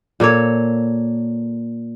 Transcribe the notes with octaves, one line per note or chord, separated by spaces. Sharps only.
A#2 A#3 A4 C#5